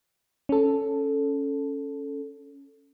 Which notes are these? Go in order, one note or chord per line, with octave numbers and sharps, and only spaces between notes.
C#4 A4